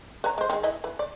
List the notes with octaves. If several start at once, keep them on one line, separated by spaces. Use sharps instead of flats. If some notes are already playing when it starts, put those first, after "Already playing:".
B4 C#5 A#5
G#3 C5
D#3 G#3
E3 E4 D#5
E3 B4
D5